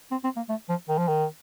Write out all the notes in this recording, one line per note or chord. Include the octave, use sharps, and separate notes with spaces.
C4
C4
A#3
A3
F3
D#3
F3
D#3